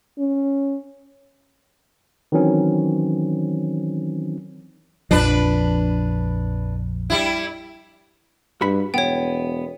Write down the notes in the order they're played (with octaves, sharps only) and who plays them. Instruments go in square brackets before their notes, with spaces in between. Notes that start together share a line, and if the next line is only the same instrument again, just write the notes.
[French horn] C#4
[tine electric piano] D#3 E3 F#3 C4 C#4
[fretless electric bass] A#1 F2 F3 [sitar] D4 B4
[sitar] G3 E4
[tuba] G2 [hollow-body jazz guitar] F#4 B5
[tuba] E1 [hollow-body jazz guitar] B3 [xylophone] C#5 G5